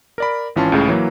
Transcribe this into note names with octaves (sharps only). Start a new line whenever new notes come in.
A#4 D5 B5
G#1 E3 C#4 F4 A5 C6
C#2 A2 C#3
E3 F#3 A#3